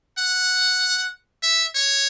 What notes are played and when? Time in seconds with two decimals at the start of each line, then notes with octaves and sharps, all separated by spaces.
0.18 F#5
1.43 E5
1.75 C#5